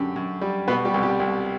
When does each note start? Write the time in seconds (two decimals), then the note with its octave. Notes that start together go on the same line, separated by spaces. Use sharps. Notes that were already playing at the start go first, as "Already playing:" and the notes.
Already playing: F#2 D3 G4
0.16 F#2
0.41 G3
0.68 B2 B3 B4
0.85 G3 G4
0.94 C2
1.03 G3 G4
1.20 C2